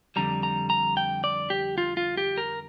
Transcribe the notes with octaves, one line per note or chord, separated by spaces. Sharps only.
F2 D3 G3 A#5
A#5
A#5
G5
D5
G4
F4
F4
G4
A#4